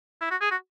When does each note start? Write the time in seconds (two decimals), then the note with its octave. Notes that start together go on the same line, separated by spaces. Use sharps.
0.21 E4
0.31 F#4
0.41 G#4
0.51 F#4